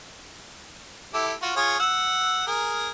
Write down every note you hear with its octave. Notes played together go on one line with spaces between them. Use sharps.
E4 G4 A4
F4 F#4
F4 G#4 C#5
F#5 E6
G#4 A#4